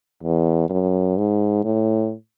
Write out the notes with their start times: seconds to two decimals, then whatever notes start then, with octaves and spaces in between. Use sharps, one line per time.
0.23 E2
0.70 F#2
1.17 G#2
1.64 A2